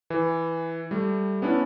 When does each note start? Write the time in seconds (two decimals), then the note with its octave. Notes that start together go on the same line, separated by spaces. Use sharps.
0.10 E3
0.91 G3 A3
1.42 B3 C#4 D4 E4